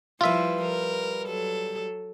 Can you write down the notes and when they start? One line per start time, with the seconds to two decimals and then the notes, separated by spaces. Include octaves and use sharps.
0.21 F3 G3 E4 F4 B4 E5
0.62 A#4
1.24 F#3 A4